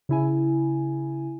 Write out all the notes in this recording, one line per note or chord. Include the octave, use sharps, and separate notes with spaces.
C#3 E4 G#5